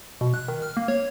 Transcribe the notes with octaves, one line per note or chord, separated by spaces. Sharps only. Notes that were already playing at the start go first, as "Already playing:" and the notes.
B2
F#6
D#3
F6
A#3
C#5